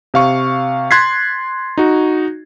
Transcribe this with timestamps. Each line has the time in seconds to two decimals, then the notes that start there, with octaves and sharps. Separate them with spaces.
0.14 C3 F5 C#6
0.91 C6 F#6 G#6 A6 B6 C7
1.77 D#4 F#4